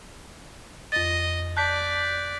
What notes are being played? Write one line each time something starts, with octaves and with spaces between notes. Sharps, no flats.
F2 D#5 A6
D5 A5 F#6 G6 B6